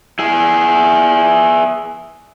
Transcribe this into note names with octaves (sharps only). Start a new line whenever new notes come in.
E4 G#4